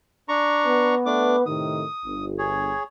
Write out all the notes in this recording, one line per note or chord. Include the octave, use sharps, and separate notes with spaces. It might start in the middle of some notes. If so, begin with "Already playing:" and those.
D4 A#5 C#6
B3 B4
A3 D4 D6
A2 C3 D#3 D#6
G1
G#4 C#5